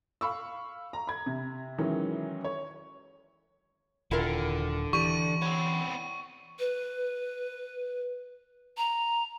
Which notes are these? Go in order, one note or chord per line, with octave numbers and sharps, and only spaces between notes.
F5 B5 C#6 E6
A#5
B5 G#6
C3
D#3 E3 F#3 G#3 C#4
C#5
D#1 D3 E4 F4 A#4
E3 G4 D5 C#6 D#7
B3 C4 C#5
B4
A#5